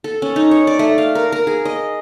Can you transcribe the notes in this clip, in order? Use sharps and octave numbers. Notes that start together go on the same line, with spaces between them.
A4
C#4
D#4
C#5
D5
A3
F5
A#4
A#4
G#4
D#5